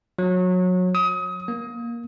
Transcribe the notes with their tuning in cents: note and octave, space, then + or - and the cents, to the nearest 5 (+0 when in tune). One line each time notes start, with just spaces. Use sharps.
F#3 -25
D#6 +30
A#3 +15